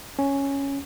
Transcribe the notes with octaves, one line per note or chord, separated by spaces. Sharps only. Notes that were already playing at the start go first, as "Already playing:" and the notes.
C#4